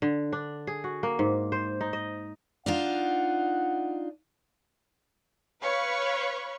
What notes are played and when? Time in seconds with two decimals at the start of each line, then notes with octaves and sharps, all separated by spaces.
0.02 D3
0.32 D4
0.67 G#4
0.84 F#4
1.03 A#3
1.19 G#2
1.52 C5
1.81 D#4
1.93 D#5
2.66 D4 D#4 F4 F#5
5.62 B4 C#5 F5 B5 C#6